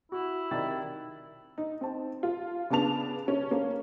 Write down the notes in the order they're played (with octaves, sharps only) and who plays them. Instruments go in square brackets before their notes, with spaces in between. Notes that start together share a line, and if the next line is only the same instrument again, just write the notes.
[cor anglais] E4 [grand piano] F#4
[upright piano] C2 D5 A6 [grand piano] D#3
[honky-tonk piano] D#4
C4 A5
F4
C#3 B3 D4 A5 F7
C#4
A#3 C#4